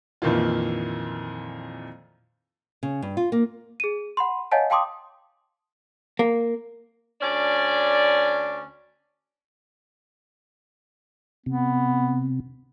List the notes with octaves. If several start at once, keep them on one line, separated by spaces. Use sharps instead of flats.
F2 A#2 D#3 E3 F4
C#3
G2
F4
A#3
G#4 D#7
F#5 B5 C6
C#5 D#5 F5 F#5 G#5 A5
F5 G5 A5 C6 D6 D#6
A#3
D2 C#4 D4 D5
C3 B3